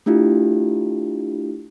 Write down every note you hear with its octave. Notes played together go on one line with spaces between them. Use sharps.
A3 D4 E4 F4 G4